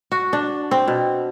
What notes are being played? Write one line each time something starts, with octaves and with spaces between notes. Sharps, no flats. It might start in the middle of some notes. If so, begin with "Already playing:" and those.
F#4
D4
C4
B2